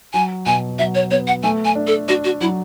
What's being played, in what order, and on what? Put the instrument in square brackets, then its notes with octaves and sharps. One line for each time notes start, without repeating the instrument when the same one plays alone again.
[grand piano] F#3 [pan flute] G#5
[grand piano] B2 [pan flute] G#5
[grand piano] F#3 [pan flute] E5
[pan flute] C#5
[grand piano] B3 [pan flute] C#5
[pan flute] F#5
[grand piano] A3 [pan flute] G#5
[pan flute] G#5
[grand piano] D4
[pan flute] A4
[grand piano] D4 [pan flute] F#4
[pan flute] F#4
[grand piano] F#3 [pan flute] E4